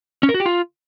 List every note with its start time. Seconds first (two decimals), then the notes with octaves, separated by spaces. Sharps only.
0.23 C#4
0.29 A#4
0.34 F#4
0.40 G4
0.46 F4